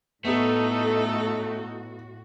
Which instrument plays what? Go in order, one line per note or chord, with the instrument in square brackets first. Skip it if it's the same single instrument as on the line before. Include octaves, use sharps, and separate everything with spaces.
[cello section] A2 F#4 [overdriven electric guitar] A3 [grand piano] B3 [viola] D#4 A4